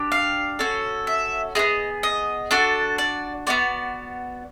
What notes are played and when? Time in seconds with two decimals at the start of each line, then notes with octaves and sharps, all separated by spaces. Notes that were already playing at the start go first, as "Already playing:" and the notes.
Already playing: D4 G4
0.12 F5
0.59 C#4 F#4 A4
1.07 E5
1.55 E4 G#4 D#5
1.59 B3
2.03 D#5
2.51 D4 F#4 A4
2.98 D5
3.47 B3 D#4 F#4 D5